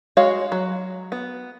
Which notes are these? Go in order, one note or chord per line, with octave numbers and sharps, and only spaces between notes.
G#3 F#4 C#5 F5
F#3
B3